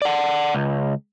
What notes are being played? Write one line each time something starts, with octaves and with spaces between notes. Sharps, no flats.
D5 F#5
C#2